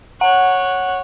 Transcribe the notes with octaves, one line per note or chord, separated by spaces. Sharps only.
C#5 F#5 F#6